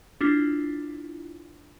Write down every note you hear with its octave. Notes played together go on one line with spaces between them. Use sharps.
D4 E4 F4